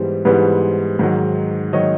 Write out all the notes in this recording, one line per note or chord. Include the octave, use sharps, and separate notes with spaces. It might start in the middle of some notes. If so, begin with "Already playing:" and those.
Already playing: G#2 E3 G3 B3 C5
G#2 E3 G3 B3
G#2 D#3 F#3
D#3 F#3 C#5 D#5